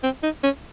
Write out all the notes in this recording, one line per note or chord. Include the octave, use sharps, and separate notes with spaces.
C4
D#4
C#4